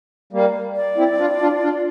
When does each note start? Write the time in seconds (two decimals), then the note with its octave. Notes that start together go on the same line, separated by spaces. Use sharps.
0.33 G3 A#3
0.76 D5
0.97 C4 E4
1.19 D4 F4
1.41 D4 F4
1.62 D4 F4